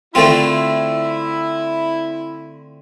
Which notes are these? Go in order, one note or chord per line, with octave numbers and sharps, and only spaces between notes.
D3 A3 C4 E4 F4